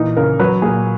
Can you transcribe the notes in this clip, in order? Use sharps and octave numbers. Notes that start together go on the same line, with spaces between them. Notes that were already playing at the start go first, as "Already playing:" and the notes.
Already playing: A#2 E3 D#4
C#3 A#4
F#3 B4
A#2 G#4